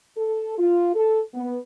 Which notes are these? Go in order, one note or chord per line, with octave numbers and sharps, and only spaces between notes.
A4
F4
A4
B3